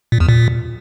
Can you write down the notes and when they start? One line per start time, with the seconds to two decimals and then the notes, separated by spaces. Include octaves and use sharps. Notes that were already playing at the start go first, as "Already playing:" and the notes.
0.12 A#2
0.20 E2
0.29 A#2